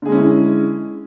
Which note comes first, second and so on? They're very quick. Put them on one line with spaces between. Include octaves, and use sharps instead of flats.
D3 G#4 G#3 C#4 E4